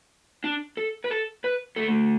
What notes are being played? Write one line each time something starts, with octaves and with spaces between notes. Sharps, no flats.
D4
A4
B4
A4
B4
D3 A3 A4